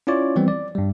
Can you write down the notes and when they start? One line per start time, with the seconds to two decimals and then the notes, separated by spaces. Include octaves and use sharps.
0.07 C#4 E4 F4 C#5 D5
0.36 E3 F3 G3 B3 C4
0.48 D5
0.75 G2 G3